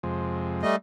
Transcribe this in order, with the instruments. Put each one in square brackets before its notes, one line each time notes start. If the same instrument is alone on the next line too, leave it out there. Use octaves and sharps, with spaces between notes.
[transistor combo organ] F2 C3 G#3
[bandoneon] G3 A3 D#5